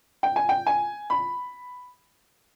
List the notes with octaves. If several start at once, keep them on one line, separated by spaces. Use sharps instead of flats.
G5
G#5
G5
G#5
B5